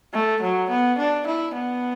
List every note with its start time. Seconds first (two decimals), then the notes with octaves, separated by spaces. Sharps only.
0.13 A3
0.42 F#3
0.70 B3
0.98 D4
1.26 E4
1.54 B3